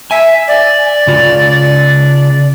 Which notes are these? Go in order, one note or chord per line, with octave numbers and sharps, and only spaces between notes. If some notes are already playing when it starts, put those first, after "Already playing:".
E5 G#5
D5
C#3 F4